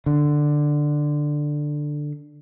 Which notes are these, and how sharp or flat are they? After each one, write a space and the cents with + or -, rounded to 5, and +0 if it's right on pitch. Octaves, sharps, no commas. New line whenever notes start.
D3 +10